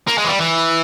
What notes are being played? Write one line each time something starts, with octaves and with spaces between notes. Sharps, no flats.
A#3
G#3
E3
G3
E3